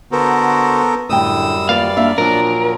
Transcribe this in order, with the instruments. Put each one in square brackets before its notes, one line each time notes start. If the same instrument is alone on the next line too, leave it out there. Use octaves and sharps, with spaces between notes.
[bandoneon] D3 F#4 C5 [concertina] B3 A4 A#4
[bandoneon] F#2 G3 [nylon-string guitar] A2 D3 G5 [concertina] D#6 E6
[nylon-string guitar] D#2 F4 B4 [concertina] D5 [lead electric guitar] F5
[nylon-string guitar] A#3 D4 E5
[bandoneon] A#2 F3 F#3 [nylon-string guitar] D4 [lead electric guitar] A#4